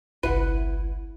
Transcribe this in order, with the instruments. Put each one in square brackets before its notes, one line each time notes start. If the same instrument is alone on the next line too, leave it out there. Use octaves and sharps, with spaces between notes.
[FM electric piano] G1 C2 E4 [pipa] B4 F#5